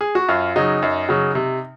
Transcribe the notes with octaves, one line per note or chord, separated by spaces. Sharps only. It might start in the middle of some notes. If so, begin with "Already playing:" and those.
G#4
F#4
F#2 F4
C#3 F#3 D#4
F#2
C#3 F#3
C3